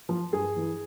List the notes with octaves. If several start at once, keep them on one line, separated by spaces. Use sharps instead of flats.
F3
G2 G#4
E3